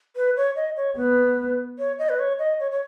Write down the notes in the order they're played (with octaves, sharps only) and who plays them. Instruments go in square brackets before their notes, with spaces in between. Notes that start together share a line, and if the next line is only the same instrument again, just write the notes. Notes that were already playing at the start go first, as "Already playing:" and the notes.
[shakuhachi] B4
C#5
D#5
C#5
[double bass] B3 [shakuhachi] B4
[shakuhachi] C#5
D#5
B4
C#5
D#5
C#5
C#5